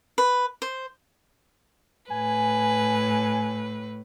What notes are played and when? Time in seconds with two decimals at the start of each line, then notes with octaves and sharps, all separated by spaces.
0.18 B4
0.62 C5
2.10 A2 B4 G#5